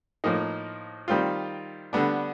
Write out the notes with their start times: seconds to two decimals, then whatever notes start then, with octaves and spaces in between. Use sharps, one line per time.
0.24 A2 F3 A#3 D#4
1.08 D#3 G3 C4 F4
1.93 D3 G3 B3 D4